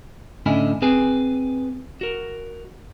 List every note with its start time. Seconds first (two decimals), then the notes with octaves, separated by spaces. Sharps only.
0.46 A2 D3 C#4 E4 D#5 G#5
0.82 C4 G#4 B4 G#5
2.01 F#4 A#4